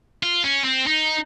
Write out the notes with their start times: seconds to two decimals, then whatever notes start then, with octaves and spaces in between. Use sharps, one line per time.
0.23 F4
0.44 C#4
0.65 C4
0.87 D#4